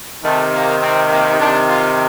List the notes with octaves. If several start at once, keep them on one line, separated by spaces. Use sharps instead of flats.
C3 D#3 A3
A#3
C4
A#3
C3 D#3 D4
F4